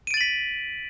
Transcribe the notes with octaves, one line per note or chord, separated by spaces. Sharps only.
A6 B6 D7 D#7 F#7